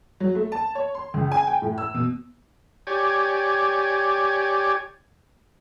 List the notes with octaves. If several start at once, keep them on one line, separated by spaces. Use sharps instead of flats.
F#3
A3
A5
C#5
C6
C#2
G#5
G5
A2
E6
B2
G4 C#5 D5 G#5